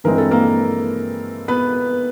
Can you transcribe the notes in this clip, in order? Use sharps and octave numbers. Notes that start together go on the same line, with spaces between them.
G2 E3 G#3 C4 A#4
A4
A#3 A#4
B3 B4